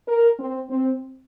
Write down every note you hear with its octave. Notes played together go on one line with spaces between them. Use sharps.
A#4
C4
C4